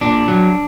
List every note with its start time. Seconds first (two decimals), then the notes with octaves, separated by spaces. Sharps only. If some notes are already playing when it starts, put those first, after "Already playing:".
0.01 A#2 D4
0.28 F#3